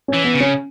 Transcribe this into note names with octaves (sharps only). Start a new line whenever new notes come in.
E3 C#4
B3
C#3
C#4